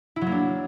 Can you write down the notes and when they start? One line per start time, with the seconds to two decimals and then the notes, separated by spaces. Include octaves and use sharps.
0.16 E4
0.21 F#3
0.27 A#3
0.32 D4